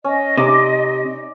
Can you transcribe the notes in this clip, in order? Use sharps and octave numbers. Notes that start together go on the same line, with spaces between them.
C#4 D#5
C3 D#4 D5 D6